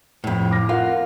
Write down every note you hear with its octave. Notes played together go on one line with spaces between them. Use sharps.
F2 A2
D6 F6 A#6
F4 A#4 F5 F#5